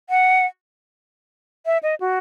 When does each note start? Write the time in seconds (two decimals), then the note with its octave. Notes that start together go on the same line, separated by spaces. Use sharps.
0.10 F#5
1.66 E5
1.83 D#5
2.00 F#4